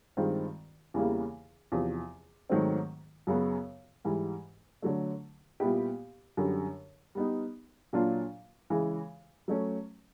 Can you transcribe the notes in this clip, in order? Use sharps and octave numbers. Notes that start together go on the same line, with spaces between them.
G2 D#3 G#3 C4 F4
E2 C#3 E3 G3 A#3
E2 C3 F3
G#2 D#3 F#3 A3 C4
F#2 C#3 F#3 B3
G#2 E3 G3
D3 F#3 A3
A#2 G3 B3 E4 G4
F#2 D3 G3
G3 B3 D#4
A#2 F#3 A#3 D4 F4
C#3 E3 G#3
F#3 A3 C#4